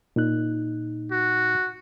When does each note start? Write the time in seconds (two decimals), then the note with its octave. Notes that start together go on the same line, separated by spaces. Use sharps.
0.16 A#2 D#4 F#6
1.11 F#4